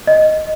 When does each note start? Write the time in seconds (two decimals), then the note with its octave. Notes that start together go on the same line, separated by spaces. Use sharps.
0.07 D#5